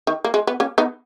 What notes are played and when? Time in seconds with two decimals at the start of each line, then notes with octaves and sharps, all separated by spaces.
0.07 D#3
0.24 A#3
0.34 G#3
0.47 B3
0.60 A#3 C#4
0.78 B3 D#4